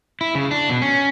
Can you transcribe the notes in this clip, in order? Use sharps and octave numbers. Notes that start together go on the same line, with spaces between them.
E4
C#3
D4
B2
C#4